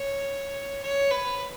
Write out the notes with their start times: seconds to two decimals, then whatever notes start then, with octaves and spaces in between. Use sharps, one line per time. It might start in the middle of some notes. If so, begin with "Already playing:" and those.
Already playing: C#5
0.82 C#5
1.11 B4